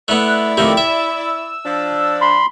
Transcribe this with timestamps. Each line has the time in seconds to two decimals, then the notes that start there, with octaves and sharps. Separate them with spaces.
0.08 A3 B3 E4 D5 F#6
0.57 F2 D#3 A3 G4
0.77 E5 E6
1.64 F3 D4
2.21 B5 C6